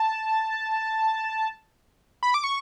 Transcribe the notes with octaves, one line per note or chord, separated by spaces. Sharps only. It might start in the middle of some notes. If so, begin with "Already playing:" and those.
Already playing: A5
B5
D6
C#6